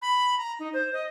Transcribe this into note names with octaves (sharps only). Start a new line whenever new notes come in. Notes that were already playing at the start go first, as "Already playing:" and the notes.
B5
A#5
D#4
C5
D#5